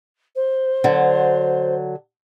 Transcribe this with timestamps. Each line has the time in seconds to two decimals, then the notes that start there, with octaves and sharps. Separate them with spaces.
0.35 C5
0.84 D3 F#3